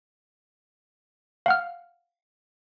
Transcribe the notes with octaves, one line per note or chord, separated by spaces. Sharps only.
F5 F#5 F6